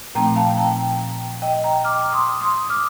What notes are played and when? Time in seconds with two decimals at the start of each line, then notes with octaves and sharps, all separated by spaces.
0.15 A#2 F3 A3 C4 D#4 G5 A#5
0.36 F5 A5
0.58 G5 A#5
1.42 D#5 G5
1.64 G5 A#5
1.84 D6 F6
2.13 C6 D#6
2.41 C6 D#6
2.66 D#6
2.69 D6 F6